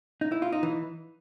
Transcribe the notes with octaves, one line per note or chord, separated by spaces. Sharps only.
D#4
E4
F4
D#4
E3